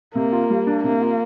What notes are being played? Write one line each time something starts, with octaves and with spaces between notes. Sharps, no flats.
C3 A#3
F4
G3
D4
C3 A#3
F4